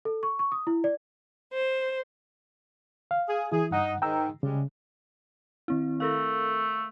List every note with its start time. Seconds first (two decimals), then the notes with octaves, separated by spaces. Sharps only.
0.05 A4
0.23 C#6
0.39 C#6
0.52 D#6
0.67 E4
0.84 D5
1.54 C5
3.11 F5
3.28 G#4
3.52 E3 E4 G#4
3.71 G2 D#4 F#5
4.02 G#2 D#3 G5 A#5 E6
4.43 C#3 G3 G#3
5.68 D#3 C4 E4
6.00 A3 A4 A#4 F5